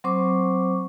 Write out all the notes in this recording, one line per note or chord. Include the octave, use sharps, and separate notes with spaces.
F#3 C4 C5 C#6 D6